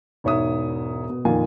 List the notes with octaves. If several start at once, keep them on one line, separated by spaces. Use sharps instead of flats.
E1 G#2 C#5 E5 D#6
B2
F2 A#2 D#3 F4 A#4 G#5